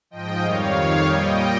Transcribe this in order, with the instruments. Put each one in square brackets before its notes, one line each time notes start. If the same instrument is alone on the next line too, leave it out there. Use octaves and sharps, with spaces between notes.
[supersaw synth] G#2 F3 D#5 G5
F2 D#3 G3 C#5 F5
F2 D#3 G3
A#2 G3 D#5 G5